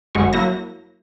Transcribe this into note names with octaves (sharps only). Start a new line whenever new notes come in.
G1 F#2 G#3 F#4 C#6
F#3 A#3 E4 A#6